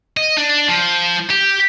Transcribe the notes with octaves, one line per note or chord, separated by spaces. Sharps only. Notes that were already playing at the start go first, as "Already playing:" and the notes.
D#5
D4
F3
G4